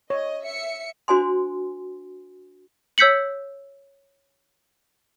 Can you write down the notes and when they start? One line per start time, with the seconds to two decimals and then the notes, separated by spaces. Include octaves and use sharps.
0.10 C#5 D#5
0.44 E5 C#7
1.08 D4 F#4 C5 G#5 C6
2.98 C#5 E6 G6 B6 C#7 F#7